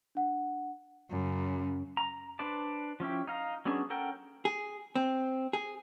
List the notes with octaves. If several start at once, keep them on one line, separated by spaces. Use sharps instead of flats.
D4 F#5
F#2 C#3
A#5
D4 B4 C5 D5 A5
F3 C#4 E4 G4
D#4 F5 A#5
F#3 B3 C#4 D4 G#4
C#4 A4 A#4 F#5 G5
G#4
C4
G#4